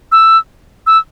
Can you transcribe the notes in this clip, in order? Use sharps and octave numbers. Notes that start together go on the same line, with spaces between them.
E6
E6